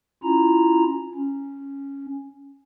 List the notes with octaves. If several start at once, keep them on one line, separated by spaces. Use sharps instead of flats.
C#4 E4 F4 A#5
C#4